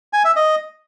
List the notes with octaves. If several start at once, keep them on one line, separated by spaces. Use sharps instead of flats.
G#5
E5
D#5